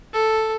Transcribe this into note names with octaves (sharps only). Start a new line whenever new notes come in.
A4